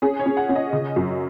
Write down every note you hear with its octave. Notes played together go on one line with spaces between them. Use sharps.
C#4 G#4
C#5
C#4
F#5
C#4
D#5
C#3
F#2